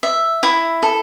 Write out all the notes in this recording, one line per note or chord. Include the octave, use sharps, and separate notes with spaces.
E5
E4
A4